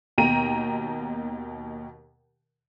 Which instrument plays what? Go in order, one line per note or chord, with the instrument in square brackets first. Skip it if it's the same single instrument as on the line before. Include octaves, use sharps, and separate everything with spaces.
[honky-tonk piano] D#2 B2 G5 A#5 D#7